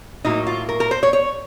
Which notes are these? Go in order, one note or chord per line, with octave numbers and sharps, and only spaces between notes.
A2 F#3 A#3 D#4
F4
A#4
A#4
C5
C#5
C#5